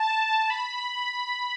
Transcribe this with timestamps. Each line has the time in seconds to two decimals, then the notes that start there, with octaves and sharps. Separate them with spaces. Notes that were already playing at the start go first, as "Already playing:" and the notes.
Already playing: A5
0.50 B5